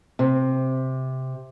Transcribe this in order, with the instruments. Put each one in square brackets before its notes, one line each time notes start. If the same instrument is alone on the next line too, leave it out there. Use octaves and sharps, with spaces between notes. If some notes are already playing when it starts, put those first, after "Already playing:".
[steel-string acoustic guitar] C3